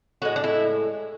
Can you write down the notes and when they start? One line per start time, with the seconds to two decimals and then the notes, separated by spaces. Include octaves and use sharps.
0.22 A2 G#3 F#4
0.36 D4
0.44 E4